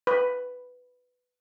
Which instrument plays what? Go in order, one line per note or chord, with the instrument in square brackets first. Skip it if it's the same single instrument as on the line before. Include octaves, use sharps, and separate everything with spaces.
[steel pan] B4